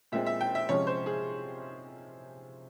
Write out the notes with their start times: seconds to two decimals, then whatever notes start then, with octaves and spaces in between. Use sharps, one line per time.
0.12 A#2 G#3 C4 E5
0.26 E5
0.41 G5
0.55 E5
0.69 C3 F3 G#3 C#4 C#5
0.87 C5
1.06 G#4